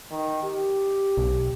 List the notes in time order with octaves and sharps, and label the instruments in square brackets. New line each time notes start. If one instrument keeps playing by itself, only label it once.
[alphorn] D#3
G4
[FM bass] B1